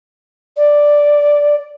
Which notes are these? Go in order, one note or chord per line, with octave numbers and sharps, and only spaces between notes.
D5